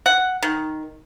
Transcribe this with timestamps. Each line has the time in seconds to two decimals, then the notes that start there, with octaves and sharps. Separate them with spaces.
0.06 F#5
0.42 D#3